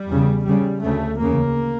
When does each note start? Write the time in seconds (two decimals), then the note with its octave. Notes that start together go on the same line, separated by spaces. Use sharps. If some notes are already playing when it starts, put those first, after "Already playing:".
Already playing: G3
0.08 E2 C#3
0.45 E2 C#3 G3
0.82 D2 C#3 A3
1.20 E2 C#3 A#3